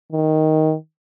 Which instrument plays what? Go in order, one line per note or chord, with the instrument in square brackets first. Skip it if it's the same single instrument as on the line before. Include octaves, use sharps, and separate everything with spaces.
[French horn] D#3